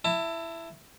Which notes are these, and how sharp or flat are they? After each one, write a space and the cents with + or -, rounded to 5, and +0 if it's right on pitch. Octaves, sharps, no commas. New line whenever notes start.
E4 +10 A5 +30